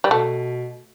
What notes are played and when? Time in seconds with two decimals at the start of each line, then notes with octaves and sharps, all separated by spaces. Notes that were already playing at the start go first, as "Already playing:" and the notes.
0.04 G3
0.10 B2 A3